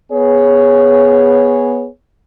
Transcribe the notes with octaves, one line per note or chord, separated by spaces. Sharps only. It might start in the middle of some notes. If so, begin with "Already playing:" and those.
B3 G#4 C#5